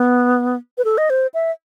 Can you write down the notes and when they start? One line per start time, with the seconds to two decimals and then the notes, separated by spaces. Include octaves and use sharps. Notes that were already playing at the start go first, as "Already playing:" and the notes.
Already playing: B3
0.78 B4
0.85 A4
0.98 D#5
1.10 C5
1.34 E5